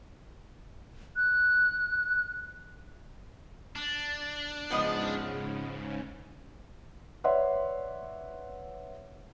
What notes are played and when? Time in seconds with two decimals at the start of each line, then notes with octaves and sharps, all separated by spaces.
1.16 F#6
3.76 D4
4.70 G#2 C#3 F3 B3 D#5
7.24 B4 C#5 D5 E5 F#5 C6